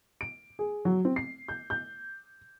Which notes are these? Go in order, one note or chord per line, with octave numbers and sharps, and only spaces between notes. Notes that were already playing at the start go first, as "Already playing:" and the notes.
D7
G#4
F#3
C4
C7
G6
G6